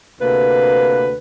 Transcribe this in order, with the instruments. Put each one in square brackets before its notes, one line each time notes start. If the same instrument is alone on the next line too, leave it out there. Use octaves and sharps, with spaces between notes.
[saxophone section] D2 C3 A#3 B4